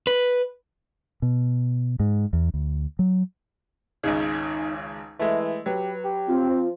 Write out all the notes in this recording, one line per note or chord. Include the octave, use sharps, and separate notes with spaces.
B4
B2
G#2
E2
D2
F#3
G#1 C#2 C#3 D#4
E3 G#3 A3 E5
F#3 G4 B4
G4
C4 F4
F3